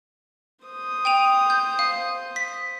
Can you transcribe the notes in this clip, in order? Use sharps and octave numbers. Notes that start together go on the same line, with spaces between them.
C5 D#6
G5 D#7 F7
G6
F5
B6